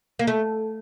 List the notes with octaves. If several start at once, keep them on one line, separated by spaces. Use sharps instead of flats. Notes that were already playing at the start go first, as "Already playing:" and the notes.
A#3
A3